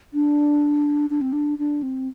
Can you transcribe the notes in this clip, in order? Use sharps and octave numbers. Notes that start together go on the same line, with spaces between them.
D4
D4
C4
D4
D4
C4